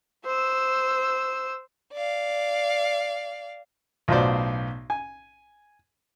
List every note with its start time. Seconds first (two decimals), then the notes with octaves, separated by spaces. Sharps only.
0.25 C5 E6
1.94 D5 F5
4.08 B1 A2 F4 F#4 C5 D5
4.90 G#5